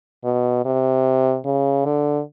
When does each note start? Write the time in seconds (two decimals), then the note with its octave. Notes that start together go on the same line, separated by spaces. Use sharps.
0.24 B2
0.65 C3
1.45 C#3
1.85 D3